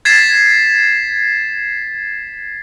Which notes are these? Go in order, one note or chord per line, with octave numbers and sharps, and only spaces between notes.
G#6 A6 B6 C7 E7